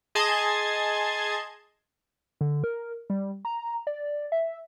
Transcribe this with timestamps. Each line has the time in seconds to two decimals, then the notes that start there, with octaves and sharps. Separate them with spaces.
0.15 G#4 D#5 A5 C6 G#6
2.41 D3
2.64 A#4
3.10 G3
3.45 A#5
3.87 D5
4.32 E5